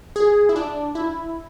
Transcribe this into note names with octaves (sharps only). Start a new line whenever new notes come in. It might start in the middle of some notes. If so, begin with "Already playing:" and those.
G#4
E4
D4
E4